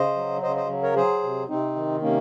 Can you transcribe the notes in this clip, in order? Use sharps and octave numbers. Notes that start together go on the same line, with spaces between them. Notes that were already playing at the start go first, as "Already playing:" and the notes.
Already playing: C#3 C5 D#5
F#3
C#3 C5 D#5
C5 D#5
F#3
A#4 C#5
F#3 G#4 C5
C3
C3 C4 D#4
D#3
C3 A#3 C#4